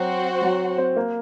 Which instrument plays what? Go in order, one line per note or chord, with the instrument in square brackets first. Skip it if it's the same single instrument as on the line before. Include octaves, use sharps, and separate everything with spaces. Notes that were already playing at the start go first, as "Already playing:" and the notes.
Already playing: [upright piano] F#3 [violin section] C4 F#4 C5 F#5
[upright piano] F#3
C4
A#3